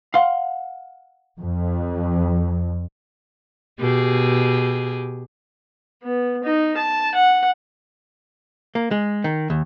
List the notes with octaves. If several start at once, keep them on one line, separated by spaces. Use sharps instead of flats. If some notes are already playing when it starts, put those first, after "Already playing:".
F5 F#5 C6
F2
B2 G4 G#4
B3
D#4
A5
F#5
A#3
G#3
D#3
D#2